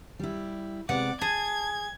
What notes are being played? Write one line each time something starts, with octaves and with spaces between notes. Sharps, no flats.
G3 E4
C3 G#3 B3 D5 F#5
G#4 A5 G#6